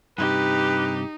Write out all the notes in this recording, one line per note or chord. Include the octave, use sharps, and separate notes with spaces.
G2 C3 D#4 G4 B4